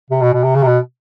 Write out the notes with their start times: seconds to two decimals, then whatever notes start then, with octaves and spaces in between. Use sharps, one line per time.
0.10 C3
0.21 B2
0.33 B2
0.43 C3
0.55 C#3
0.62 C3
0.67 B2